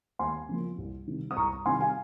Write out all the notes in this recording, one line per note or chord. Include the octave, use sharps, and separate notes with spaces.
D#2 G#5 C6
C#3 F3 A#3
C2
C3 D#3 G3
D#6
C2 A#5 C#6
C3 D#3 G3 G#5 C6
F5 G#5